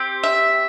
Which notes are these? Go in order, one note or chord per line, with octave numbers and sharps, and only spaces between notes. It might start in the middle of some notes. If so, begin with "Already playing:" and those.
Already playing: C4 G4
E5